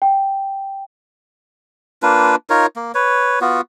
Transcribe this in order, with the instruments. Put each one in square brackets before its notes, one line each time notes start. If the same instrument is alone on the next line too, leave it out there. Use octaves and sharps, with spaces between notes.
[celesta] G5
[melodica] A#3 D4 F4 B4
D#4 F4 A#4 C#5
A#3
B4 C#5
B3 F4 F#4